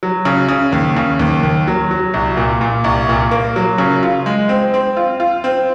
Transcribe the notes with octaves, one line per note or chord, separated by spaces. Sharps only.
F#3
C#3
C#3
D#2
C#3
D#2
D#2
F#3
F#3
C2
A#2
A#2
C2
A#2
A#3
F#3
C#3
F4
G#3
C4
C4
F4
F4
C4